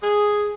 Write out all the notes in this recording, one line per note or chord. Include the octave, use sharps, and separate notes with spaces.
G#4